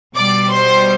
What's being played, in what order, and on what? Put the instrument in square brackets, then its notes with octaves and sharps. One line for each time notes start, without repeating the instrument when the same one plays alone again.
[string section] B2 G3 D5 D6
C5 C6